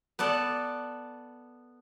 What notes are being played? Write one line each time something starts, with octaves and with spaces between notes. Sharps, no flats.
B3 A4 D5 A5